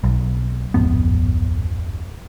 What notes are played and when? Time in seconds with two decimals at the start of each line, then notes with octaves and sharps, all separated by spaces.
0.04 B1
0.74 D1 G#1 F2 B3